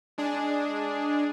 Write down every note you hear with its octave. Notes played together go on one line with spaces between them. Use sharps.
G#3 D4 G#4